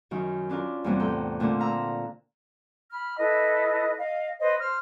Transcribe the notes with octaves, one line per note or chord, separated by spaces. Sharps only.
F#2 D#3 D#4
C#4 D4 F4 A#4
E2 G2 C3 G3 A#3 C4
A2 A4 G5 A#5
A#2 D3 A3 A#3 C4 D4
F5 A#5 E6
B5 F6
E4 A4 B4 D#5
D#5 F5
B4 C5 D#5
C5 F6